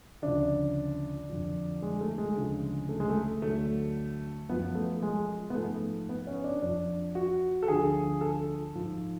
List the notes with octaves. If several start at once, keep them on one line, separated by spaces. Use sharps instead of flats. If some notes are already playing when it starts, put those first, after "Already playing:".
D2 C#3 F3 D4
F2 D3 F3
G#3
A3
G#3
D2 C#3 F3
A3
G#3
A3
D2 D3 F#3 A3
F#2 F3 B3
A3
G#3
B3
G#2 F3 A3
B3
C#4
D4
F2 F3 D4
F#4
A4
D2 D3 F3 G#4
A4
G#2 F3